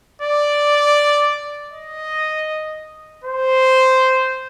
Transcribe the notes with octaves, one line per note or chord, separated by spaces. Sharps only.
D5
D#5
C5